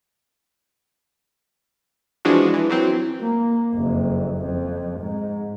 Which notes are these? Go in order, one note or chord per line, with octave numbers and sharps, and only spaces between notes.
E3 F3 G#3 D4 F#4
E3
E3 F#3 C4
A#3
F#1 F2
F2
G#2